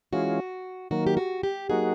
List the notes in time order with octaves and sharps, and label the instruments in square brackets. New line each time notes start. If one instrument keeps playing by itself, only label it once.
[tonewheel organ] E3 G#3 C#4 F4 [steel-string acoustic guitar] F#4
[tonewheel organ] D#3 F#3 A#3 [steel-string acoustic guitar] F#4
[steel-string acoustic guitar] G4
F#4
G4
[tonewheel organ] F#3 A#3 D#4 F#4 [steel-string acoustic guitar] G#4